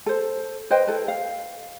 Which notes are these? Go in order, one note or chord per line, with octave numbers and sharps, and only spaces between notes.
A4 C5
B4 C5 D#5 G5
E4 A4 B4
F5